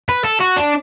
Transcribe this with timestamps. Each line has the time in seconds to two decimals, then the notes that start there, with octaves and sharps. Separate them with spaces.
0.09 B4
0.24 A4
0.40 F#4
0.57 D4